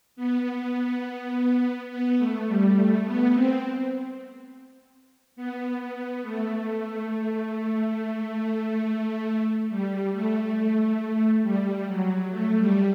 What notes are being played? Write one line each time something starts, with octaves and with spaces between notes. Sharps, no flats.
B3
B3
A3
G3
A3
B3
C4
B3
B3
A3
G3
A3
G3
F#3
A3
G3